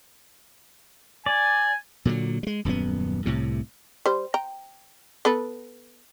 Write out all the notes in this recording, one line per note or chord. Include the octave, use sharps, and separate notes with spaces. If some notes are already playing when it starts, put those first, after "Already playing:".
D5 G#5
A#2 D3 E3 F#3
G3 G#3
D#1 F#2 F3 B3
C2 A2 C3
G3 C5
G5 A#5
B3 A4 B4